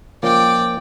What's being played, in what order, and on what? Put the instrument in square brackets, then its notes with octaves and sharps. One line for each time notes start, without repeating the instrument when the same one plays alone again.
[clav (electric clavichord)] F3 A#3 C#4 [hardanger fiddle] D5 G5